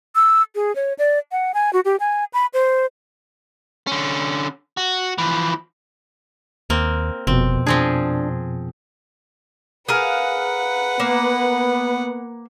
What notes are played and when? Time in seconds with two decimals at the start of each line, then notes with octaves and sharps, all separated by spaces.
0.15 E6
0.55 G#4
0.76 C#5
0.99 D5
1.32 F#5
1.54 G#5
1.73 F#4
1.85 G4
2.00 G#5
2.33 B5
2.54 C5
3.87 D3 C#4
4.77 F#4
5.18 E3 F3
6.70 D#2 A#3 C4
7.27 F1 F2 B2 C4
7.66 F3 C4 D4 G#4
9.88 G#4 A#4 B4 F5 F#5
11.00 A#3 B3